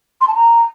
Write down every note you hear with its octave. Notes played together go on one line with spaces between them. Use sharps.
C6
A5
A#5